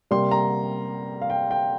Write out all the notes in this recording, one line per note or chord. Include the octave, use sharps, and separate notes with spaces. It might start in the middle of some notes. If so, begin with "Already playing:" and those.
C3 G3 A#3 C6
A#5
F5
G5
G5